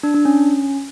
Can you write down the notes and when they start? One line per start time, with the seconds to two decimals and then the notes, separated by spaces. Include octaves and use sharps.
0.03 D4
0.14 D4
0.25 C#4